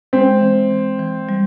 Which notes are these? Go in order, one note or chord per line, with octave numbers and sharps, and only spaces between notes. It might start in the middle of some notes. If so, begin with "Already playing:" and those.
G#3 C4
E3
E3
E3
G3